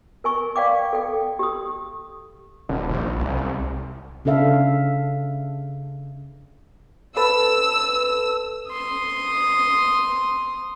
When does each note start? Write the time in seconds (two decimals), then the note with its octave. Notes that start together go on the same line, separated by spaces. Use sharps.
0.24 A#4 G#5 C#6
0.56 D5 F5 G5 D6
0.93 A4 G5
1.39 G4 D#6
2.69 D#1
2.89 A#1
3.16 C2
4.25 C#3 D4 A4 E5 F5
7.17 A4 B4 A5 E6
8.70 C6 D#6